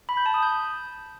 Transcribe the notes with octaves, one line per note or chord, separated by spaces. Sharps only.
B5
G6
A5
D#6
G6